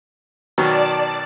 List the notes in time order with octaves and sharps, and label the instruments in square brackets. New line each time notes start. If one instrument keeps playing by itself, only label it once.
[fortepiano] B2 D#3 F#3 [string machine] D5 A5